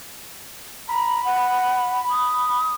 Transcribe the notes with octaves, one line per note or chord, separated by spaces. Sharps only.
A#5 B5
F#5
D#6